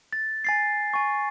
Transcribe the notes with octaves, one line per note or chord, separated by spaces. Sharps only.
A6
G#5 A6 C7
G#5 C#6